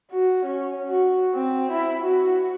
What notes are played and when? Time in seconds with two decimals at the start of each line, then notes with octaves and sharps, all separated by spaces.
0.11 F#4
0.45 C#4
0.89 F#4
1.34 C4
1.72 E4
2.02 F#4